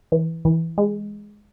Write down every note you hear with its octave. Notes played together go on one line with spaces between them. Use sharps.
E3
E3
G#3